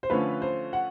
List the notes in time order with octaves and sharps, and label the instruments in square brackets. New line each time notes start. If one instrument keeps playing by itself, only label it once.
[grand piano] C5
[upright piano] D3 F3 A3 C#4 [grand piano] B4
[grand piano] C5
F#5